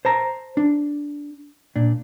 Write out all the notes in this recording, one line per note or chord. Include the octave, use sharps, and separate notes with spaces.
C5 A5 A#5
D4
A#2 D4